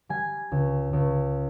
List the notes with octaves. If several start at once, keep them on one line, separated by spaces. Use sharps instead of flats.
G3 G#5
C#2
C#2